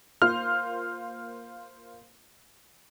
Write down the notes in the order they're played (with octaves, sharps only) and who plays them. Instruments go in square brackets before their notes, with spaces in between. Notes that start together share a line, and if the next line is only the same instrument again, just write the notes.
[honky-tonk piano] A#3 F4 C5 [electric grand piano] F6